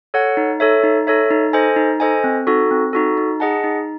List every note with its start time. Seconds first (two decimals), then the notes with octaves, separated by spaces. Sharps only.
0.14 A4 C#5 F#5
0.37 D#4
0.60 A4 C#5 E5
0.84 D#4
1.07 A4 C#5 E5
1.30 D#4
1.53 A4 C5 D#5 G#5
1.76 D#4
2.00 A4 C5 D#5 G#5
2.24 C4
2.47 D#4 F#4 A4
2.71 C4
2.93 D#4 F#4 A4
3.18 D#4
3.40 G#4 D#5 F#5 A5
3.64 D#4